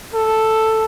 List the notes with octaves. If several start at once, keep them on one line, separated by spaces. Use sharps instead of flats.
A4